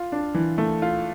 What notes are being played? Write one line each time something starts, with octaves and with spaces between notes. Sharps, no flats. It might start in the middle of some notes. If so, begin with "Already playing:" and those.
Already playing: F4
D4
E3
A3
F4